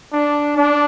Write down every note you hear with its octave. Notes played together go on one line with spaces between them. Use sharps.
D4
D4